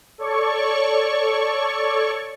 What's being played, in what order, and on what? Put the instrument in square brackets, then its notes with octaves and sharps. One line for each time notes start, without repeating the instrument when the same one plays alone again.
[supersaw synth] A4 C#5 D5 C#6